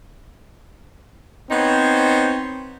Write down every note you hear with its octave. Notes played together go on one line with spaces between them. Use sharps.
B3 C4 D#4 C5 C#5